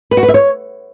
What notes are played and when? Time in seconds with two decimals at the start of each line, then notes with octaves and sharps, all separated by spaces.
0.11 B4
0.17 F#4
0.23 B4
0.28 E5
0.34 C#5